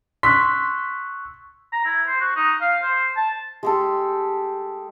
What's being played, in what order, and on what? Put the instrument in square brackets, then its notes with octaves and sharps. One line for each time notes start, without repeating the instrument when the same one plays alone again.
[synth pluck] C6 [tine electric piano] C#6 E6 F#6 [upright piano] B6
[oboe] A#5
E4
C5
F#4
D#4
F5
C5
A5
[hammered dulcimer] G#3 G4 A4